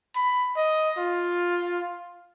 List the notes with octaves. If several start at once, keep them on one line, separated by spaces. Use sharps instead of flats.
B5
D#5
F4